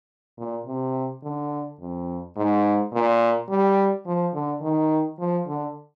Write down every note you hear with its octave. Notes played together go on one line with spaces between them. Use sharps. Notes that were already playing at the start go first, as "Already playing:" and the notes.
A#2
C3
D3
F2
G#2
A#2
G3
F3
D3
D#3
F3
D3